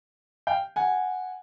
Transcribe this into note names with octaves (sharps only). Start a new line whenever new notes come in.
F5 G5
F#5 G#5